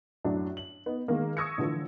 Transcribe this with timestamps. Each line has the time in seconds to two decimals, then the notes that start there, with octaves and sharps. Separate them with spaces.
0.25 F#2 A2 F#3 D4
0.57 F#7
0.86 B3 D#4
1.08 D#3 G#3 A#3
1.37 C#6 D#6 E6 G#6 A#6 C#7
1.58 A2 D3 E3 F3